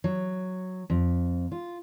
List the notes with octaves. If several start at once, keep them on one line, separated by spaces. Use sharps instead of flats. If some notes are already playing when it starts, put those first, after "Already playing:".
F#3
F2
F4